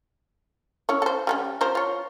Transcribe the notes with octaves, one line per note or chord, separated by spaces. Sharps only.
C#4 E4 C#5
A4 C5
G3 B3 C#4
F3 A#4 C5
F4 C#5